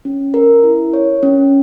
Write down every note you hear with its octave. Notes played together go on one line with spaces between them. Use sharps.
C#4
A#4
E4
C#5
C#4